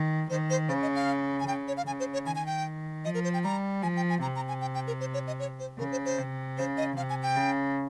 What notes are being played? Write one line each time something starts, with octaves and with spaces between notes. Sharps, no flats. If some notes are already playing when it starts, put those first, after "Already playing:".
Already playing: D#3
D#3 C5
C5
C#3 C5
D#5
F5
G#5
C#3 G5
C#5
F5
C#3 G#5
C5
C#5
D#3 G#5
G#5
G5
F3 D#5
A#4
C5
G5
G3 A#5
F3 G#5
G5
G#5
C3 A#5
A#5
G#5
G5
G5
A#4
C5
C#5
D#5
C#5
C5
C#3 A#4
C5
C5
C3
C#3 C5
D#5
C3 F5
G#5
G5
C#3